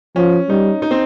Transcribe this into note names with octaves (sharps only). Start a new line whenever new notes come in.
F3 C#4
G3 D#4
D#4
C4